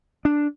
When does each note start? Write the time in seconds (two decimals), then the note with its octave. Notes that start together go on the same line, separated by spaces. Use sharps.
0.25 D4